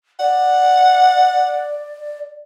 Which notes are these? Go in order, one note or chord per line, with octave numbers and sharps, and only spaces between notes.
D5 F#5